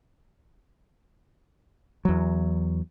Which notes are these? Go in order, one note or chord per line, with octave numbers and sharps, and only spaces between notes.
E2 F#3